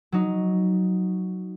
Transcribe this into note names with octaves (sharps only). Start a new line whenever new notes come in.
F#3 D#4